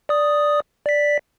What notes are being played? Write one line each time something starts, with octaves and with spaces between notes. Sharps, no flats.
D5 D#6
D5 B6